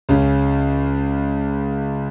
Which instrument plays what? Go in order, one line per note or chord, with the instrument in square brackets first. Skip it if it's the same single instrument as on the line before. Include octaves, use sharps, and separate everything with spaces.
[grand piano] C#2 C#3